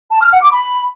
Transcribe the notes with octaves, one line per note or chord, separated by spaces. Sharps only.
A5
F6
F#5
D6
B5